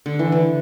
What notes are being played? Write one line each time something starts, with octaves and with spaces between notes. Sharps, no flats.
D3
E3
D3